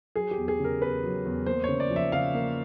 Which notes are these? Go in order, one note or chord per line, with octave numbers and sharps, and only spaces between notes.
F#3 G#4
G4
E2
G#4
C#3
A#4
E2 B4
F#3
E2
A#3 C5
C#3 C#5
D5
F3
E5
C#3 F5
A#3